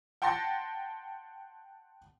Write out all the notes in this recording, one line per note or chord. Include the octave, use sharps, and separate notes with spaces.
F#5 G5 A5 C6 A6 A#6